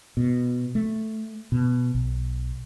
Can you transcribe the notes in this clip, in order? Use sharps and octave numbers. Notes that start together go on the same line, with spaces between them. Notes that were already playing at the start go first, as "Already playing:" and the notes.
B2
A3
B2
B1